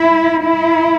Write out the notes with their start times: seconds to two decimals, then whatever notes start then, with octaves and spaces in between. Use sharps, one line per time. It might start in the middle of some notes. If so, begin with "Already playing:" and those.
Already playing: E4
0.41 E4